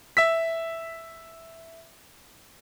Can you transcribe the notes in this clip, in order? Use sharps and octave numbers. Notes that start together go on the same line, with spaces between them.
E5 E6 B6